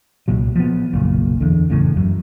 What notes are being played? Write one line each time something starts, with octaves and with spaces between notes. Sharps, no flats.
C2 A#2 F#3
F3 B3
F#1 B1 A#2
E2 D3
F#1 E2 A2 C#3
F#2 F#3